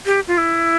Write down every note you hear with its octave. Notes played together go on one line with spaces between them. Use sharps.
G4
F4
E4